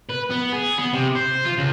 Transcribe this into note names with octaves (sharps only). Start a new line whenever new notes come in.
B4
B3
G#4
B3
C3
C5
F4
C#2